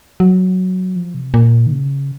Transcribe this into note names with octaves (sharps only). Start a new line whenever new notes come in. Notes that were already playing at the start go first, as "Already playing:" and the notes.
F#3
F3
C3
A#2
D#3
C#3